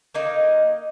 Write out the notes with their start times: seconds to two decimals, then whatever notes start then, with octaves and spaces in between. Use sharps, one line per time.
0.14 A#3 D#4 D#5